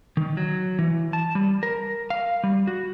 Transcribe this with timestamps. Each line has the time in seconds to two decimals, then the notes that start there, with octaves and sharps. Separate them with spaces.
0.17 D#3
0.37 F#3
0.79 E3
1.13 A5
1.35 G3
1.63 A#4
2.10 F5
2.44 G3
2.67 F#4